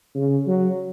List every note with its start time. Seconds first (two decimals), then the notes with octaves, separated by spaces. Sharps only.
0.15 C#3
0.46 F#3